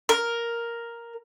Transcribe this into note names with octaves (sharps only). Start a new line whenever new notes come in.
A#4